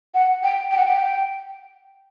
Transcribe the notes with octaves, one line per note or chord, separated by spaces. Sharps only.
F#5
G5
G5
F#5
G5